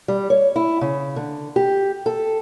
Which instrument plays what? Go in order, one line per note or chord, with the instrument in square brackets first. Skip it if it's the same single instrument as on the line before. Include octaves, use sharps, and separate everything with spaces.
[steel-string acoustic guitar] G3
C#5
E4
C#3
D3
G4
A4